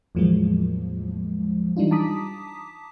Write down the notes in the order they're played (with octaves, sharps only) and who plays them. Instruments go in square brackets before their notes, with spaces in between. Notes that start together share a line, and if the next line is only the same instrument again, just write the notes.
[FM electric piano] E2 A2 F3 F#3 G#3 A#3
E3 G3 D4 D#4 F4
A5 A#5 D6 D#6 B6